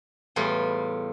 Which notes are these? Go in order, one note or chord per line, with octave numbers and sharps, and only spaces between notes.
E2 A2 G3 F4